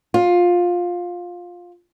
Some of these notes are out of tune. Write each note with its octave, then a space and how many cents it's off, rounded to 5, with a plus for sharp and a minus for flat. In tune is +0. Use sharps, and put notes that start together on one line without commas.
F4 +15